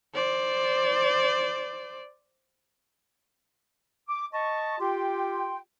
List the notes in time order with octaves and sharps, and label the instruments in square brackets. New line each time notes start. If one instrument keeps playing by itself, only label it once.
[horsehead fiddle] C5 D5
[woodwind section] D6
D#5 A5 C#6
F4 G4 G5 C6